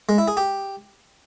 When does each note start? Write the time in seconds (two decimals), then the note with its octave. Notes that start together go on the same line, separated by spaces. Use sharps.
0.09 G#3
0.18 E4
0.28 G#4
0.37 G4